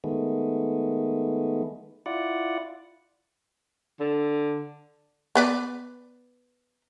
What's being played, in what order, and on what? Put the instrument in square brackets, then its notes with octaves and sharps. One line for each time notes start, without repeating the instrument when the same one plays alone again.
[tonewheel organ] D#3 G#3 A3 B3
E4 F4 D5 F#5
[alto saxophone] D3
[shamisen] B3 B4 D5